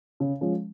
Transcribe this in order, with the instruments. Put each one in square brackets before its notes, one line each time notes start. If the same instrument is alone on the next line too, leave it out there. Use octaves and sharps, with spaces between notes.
[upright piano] C#3
F3 G#3 C#4